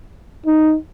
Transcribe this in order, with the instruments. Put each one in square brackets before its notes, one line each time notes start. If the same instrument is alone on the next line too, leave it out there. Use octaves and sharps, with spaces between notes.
[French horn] D#4